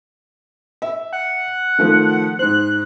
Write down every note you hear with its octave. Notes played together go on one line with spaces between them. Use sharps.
E5
F#5
D#3 F3 A3
G#2 C5 F#6